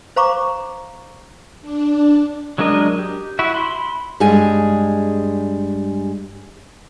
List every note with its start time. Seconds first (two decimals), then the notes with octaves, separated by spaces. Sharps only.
0.16 C5 F5 A#5 C#6 D6
1.62 D4
2.58 F#3 G#3 D4 A#4 D#5
2.99 G4
3.39 E4 F#4 E5
3.54 B5 C6
4.20 G2 G3 G#3 G#4 G#5